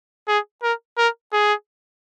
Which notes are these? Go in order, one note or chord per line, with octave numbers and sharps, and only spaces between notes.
G#4
A#4
A#4
G#4